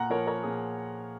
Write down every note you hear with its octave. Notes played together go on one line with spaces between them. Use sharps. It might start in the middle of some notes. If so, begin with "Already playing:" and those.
Already playing: A#2 F#5 A#5
F3 A#4 C#5
A#4 C#5
A#2 G#4